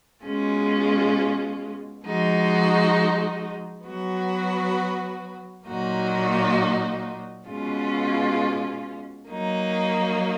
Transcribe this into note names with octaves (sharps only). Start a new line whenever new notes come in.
B2 G#3 C#4 F4
F3 G#3 D#4 F#4
F#3 B3 F#4
A#2 F#3 A#3 D#4 F#4
B2 G#3 C#4 F4
F#3 A#3 D#4